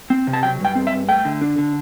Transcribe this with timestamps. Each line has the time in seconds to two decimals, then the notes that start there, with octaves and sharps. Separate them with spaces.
0.10 C4
0.27 C3
0.33 A5
0.43 F#3 G5
0.60 G2 G5
0.75 C4
0.87 E5
0.92 G2
1.09 A3 G5
1.25 D3
1.41 D4
1.58 D3